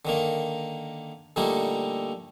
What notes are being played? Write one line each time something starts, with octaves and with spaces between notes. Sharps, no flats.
D3 D#3 A#3
A#2 D3 G3 A3 A#3 D#4